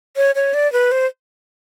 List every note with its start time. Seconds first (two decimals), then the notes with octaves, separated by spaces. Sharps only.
0.16 C#5
0.35 C#5
0.54 D5
0.72 B4
0.91 C5